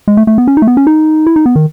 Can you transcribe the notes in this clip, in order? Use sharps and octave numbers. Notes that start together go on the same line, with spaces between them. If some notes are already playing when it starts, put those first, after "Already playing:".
G#3
A3
A3
B3
C#4
D#4
A3
B3
C#4
D#4
E4
D#4
B3
D#3